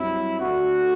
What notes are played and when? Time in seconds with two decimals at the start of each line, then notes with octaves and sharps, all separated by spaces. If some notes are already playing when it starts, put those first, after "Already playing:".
Already playing: G2 F#3 C4 E4
0.40 D2 D3 A3 D4 F#4